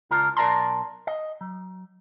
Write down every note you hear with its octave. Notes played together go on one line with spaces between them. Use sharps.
C#2 D4 F4 A#4
B1 A#4 D5 A5 A#5 C6
D#5
F#3